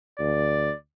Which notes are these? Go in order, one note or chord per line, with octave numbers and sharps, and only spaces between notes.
D2 D5